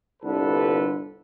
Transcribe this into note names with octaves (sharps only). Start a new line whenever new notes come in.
G1 C2 D3 A4 B4